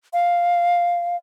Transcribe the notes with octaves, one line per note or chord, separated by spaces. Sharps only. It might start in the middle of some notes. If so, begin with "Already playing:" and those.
F5